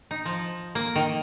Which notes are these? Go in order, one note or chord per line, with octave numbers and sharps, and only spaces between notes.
D#4
F3
A#3
D#3